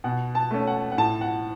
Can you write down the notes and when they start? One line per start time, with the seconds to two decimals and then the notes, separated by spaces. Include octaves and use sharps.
0.04 B2 F#5
0.35 A5
0.51 A3 C#4
0.67 F#5
0.92 F#5
0.98 A2 A5
1.21 F#5